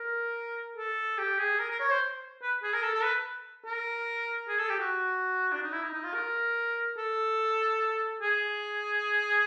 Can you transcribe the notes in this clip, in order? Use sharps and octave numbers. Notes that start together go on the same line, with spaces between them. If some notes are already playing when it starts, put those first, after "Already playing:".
Already playing: A#4
A4
G4
G#4
A#4
A#4
C#5
C5
B4
G#4
A#4
A4
A4
B4
A#4
G#4
A4
G4
F#4
D4
D#4
E4
D#4
D#4
F4
A#4
A4
G#4